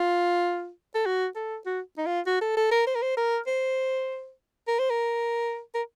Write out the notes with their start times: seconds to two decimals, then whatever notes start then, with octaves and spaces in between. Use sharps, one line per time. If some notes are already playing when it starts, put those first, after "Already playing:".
Already playing: F4
0.95 A4
1.06 F#4
1.35 A4
1.66 F#4
1.98 D#4
2.06 F4
2.26 F#4
2.41 A4
2.57 A4
2.71 A#4
2.87 C5
2.95 A#4
3.02 C5
3.17 A#4
3.47 C5
4.67 A#4
4.79 C5
4.90 A#4
5.74 A#4